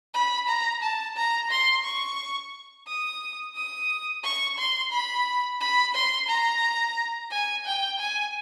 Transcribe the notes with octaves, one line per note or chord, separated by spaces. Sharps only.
B5
A#5
A5
A#5
C6
C#6
D#6
D#6
C#6
C6
B5
B5
C6
A#5
G#5
G5
G#5